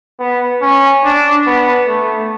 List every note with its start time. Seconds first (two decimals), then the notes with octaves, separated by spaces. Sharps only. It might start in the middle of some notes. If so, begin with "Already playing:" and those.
0.19 B3
0.62 C#4
1.04 D4
1.47 B3
1.88 A3